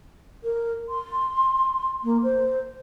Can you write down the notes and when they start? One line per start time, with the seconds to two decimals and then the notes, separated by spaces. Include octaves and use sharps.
0.44 A#4
0.89 C6
2.04 A#3
2.23 C5